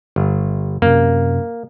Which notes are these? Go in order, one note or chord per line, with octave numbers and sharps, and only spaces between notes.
G1
F#2 C3 A#3